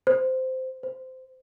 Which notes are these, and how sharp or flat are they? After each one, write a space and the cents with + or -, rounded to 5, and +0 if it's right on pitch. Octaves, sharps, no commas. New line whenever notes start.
C5 -10
C5 -15